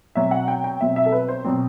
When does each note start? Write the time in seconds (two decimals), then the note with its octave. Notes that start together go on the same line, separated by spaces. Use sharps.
0.15 B2 F#3 C4 E5
0.31 F#5
0.48 G5
0.64 G5
0.81 B2 F#3 C4 E5
0.96 E5
1.06 A4
1.12 B4
1.29 C5
1.44 B2 F#3 C4